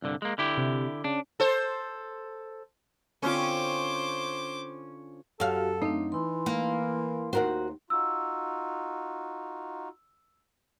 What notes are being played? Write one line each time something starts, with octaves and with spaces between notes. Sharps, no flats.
C2 G2 D3
G#3 A#3
D3 E4 G4
C3
C#3 D4
A4 C5
D3 C4 C#4 F4 C5 D6
F#2 F#4 G4 A4 F5
A3 C4 D4 D#4
E3 E4 C6
A#3
D#2 G#2 F#4 A#4 C5 F#5
D#4 F4 F#4 E6